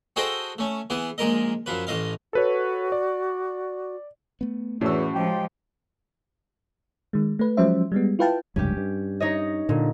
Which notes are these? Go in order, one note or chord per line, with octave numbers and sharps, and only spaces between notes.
F#4 G#4 A4 C5 D#5 G5
A3 C#4
E3 B3 G#4
A#1 G#3 A#4 D#5
F#2 F3 B4
A1 A2 D#5 F5
F#4 A4 B4 C#5
D5
A3 B3
E2 A2 E3 C#4 F#4 E6
F3 G#3 D#4 G4 G5
D#3 G#3
A3 B4
F3 F#3 G#3 C#4 C5 E5
G3 G#3 B3
E4 F4 B4 F5 G5 A5
F1 C#2 G2 C#4 G4
G2
D#4 C#5 D#5
A#2 D3